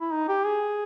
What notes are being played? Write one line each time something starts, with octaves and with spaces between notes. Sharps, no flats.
E4
D#4
G4
G#4